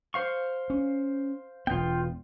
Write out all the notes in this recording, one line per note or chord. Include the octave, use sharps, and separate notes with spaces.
C5 F5 C#6
C#4
E1 B3 F4 G5